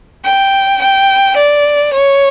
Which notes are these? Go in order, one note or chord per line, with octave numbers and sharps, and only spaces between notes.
G5
G5
D5
C#5